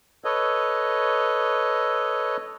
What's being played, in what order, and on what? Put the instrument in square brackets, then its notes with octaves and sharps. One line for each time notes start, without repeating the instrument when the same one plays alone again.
[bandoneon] A4 B4 C#5 D#5